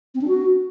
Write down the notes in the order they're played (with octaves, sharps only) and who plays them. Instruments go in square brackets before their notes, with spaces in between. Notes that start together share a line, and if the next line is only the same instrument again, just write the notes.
[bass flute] C4
D4
F#4